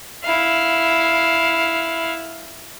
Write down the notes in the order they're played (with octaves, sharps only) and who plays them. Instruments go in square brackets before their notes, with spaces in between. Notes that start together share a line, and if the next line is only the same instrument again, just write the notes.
[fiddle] E4 F5